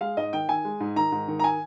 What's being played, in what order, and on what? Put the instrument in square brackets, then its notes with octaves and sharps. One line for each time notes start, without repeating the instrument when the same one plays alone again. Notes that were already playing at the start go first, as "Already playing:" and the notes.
[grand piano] G#3 F5
G#2 D#5
D#3 G5
D#3 G#5
G#3
G#2
D#3 A#5
G#2
D#3
A#5
G#5